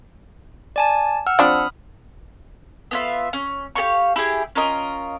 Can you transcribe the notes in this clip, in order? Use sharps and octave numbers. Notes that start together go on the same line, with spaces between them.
D5 G#5 A5
F#5 E6 F6
F3 C4 D4 B5 D#6 F6
B3 F4 E5
C#4
G4 A4 F5 C#6
E4 G4 G#4
C#4 F4 A#4 D#5